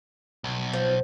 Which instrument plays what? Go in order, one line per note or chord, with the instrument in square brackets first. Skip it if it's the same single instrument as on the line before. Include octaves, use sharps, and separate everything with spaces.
[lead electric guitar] B1
[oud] F3